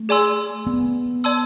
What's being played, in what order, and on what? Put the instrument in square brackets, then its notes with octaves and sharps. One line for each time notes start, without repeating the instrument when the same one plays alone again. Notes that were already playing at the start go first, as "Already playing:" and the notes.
Already playing: [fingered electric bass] A3
[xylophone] G#4 D5 G#5 C6 E6
[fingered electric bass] B3
[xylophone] D5 A5 C6 E6